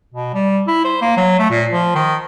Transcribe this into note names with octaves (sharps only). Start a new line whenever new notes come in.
B2
G3
E4
C5
A#3
F#3
A3
A#2
F3
D#3